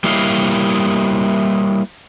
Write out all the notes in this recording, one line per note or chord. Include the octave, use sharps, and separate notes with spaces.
G3 A#3 E4 C#5 D#5 F5